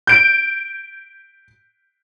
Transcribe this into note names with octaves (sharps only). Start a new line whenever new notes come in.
G6 D7